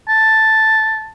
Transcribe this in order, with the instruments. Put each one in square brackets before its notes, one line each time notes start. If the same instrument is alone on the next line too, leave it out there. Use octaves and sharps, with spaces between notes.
[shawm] A5